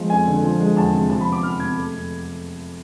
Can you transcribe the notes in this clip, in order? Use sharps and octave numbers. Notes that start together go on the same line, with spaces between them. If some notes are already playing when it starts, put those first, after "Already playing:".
Already playing: F3 G#3 B3
F2 G#5
D3
F3
G#3
E2 A5
C3
F3 A5
B5
B3
D6
F2 F6
C3 G#6
A3
F2